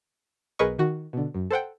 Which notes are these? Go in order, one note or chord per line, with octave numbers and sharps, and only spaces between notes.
B1 G#4 A#4 B4 D#5 C#6
D#3 F#4
B2 D3
F#2
A4 C5 F#5 G5